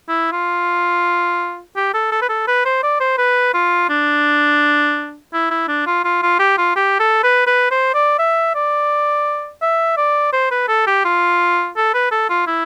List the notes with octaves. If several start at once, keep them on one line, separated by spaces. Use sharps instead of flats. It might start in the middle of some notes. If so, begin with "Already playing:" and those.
E4
F4
G4
A4
A4
B4
A4
B4
C5
D5
C5
B4
F4
D4
E4
E4
D4
F4
F4
F4
G4
F4
G4
A4
B4
B4
C5
D5
E5
D5
E5
D5
C5
B4
A4
G4
F4
A4
B4
A4
F4
E4